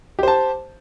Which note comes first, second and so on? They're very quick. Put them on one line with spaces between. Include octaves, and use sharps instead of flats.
G4 C5 A5